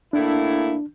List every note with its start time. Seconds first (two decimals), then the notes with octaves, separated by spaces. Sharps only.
0.13 A2 A#3 D4 E4